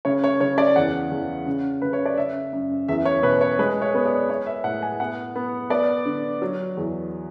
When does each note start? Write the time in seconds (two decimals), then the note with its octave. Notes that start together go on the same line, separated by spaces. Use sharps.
0.05 C#3 C#5
0.24 C#5
0.41 C#3 C#5
0.58 D5
0.76 E2 F#5
1.11 E2
1.46 C#3
1.82 C#3 B4
1.93 C#5
2.06 D5
2.17 C#3 E5
2.53 F#2
2.88 E2 E5
3.05 C#5
3.23 B2 B4
3.41 C#5
3.59 G#3 B4
3.82 C#5
3.95 B3
4.06 D5
4.30 B3 C#5
4.46 E5
4.64 A2 F#5
4.82 G#5
5.00 B3 F#5
5.36 B3
5.70 B3 D5
6.05 D3
6.42 F#3
6.77 E2